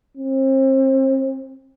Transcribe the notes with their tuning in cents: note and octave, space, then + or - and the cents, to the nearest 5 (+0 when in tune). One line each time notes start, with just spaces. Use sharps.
C4 +35